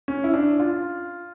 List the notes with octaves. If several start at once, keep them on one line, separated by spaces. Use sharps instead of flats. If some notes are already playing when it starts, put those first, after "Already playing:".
C#4
E4
D4
F4